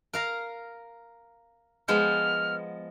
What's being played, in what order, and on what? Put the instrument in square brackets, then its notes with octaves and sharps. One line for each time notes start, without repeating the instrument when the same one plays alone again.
[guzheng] A#4 F5 A#5
[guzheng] F3 G#3 B3 [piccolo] F6